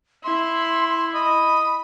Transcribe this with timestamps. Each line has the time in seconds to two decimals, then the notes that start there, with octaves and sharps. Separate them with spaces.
0.24 E4 C6
1.14 D#5 B5